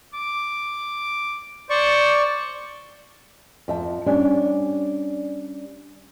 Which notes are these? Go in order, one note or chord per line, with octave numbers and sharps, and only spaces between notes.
D6
C5 D5 C#6
F2 E5 A5
G3 C#4 D4